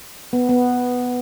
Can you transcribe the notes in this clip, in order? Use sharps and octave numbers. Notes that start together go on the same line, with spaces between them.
B3
B3